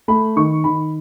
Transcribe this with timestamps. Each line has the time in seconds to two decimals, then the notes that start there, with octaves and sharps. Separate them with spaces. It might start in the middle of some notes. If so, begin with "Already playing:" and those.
0.08 A3 B5
0.36 D#3 C#6
0.64 D#3 B5